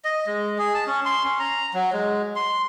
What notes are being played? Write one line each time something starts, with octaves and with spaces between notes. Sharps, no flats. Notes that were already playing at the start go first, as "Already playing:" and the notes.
D#5
G#3
G#4
A5
C#4
C6
C#4
A#5
F#3
G#3
C6